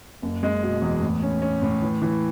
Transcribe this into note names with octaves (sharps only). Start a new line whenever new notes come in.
F#1
G#3
B2
E2
A2
C#4
C#4
A2
E3
E3